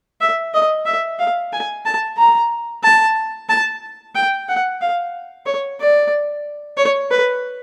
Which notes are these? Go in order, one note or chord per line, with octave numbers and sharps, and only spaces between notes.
E5
D#5
E5
F5
G#5
A5
A#5
A5
A5
G5
F#5
F5
C#5
D5
C#5
B4